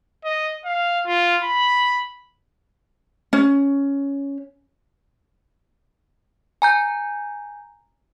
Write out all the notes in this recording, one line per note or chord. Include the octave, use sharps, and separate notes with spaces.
D#5
F5
F4
B5
C#4
G#5 A#5 G6